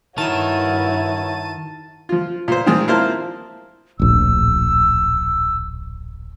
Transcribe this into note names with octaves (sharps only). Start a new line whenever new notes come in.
G2 D#3 E4 F#4 A#4 C#5 A5 D#7
F3 F4
A#2 C5
D#3 F3 G#3 C4 F4
A#3 E4 F4 C5 F5 A5
D1 A#1 E6